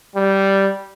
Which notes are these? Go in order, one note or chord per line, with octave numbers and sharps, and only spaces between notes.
G3